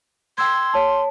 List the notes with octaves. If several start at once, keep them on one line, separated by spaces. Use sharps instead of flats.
G5 C6 E6 G#6
C#5 A5